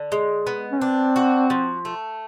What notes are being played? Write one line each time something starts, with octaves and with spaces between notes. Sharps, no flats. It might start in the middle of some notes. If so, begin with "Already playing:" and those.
Already playing: D3
G#3
B3
C#4
C4 D4
F#4
F3
A3